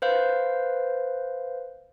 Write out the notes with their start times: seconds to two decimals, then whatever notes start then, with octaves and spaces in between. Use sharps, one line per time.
0.02 B4 C5 F5